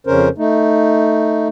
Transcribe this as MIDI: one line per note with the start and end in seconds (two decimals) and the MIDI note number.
0.07 0.28 41
0.07 0.28 49
0.07 0.28 61
0.07 0.28 70
0.07 0.28 72
0.38 1.48 57
0.38 1.48 63